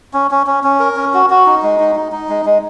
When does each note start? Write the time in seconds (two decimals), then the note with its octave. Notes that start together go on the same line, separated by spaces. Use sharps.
0.14 C#4
0.31 C#4
0.47 C#4
0.64 C#4
0.80 A#4
0.96 C#4
1.14 F#4
1.30 F#4
1.46 D#4
1.63 G#3
1.80 D#4
1.95 D#4
2.12 D#4
2.29 G#3
2.46 G#3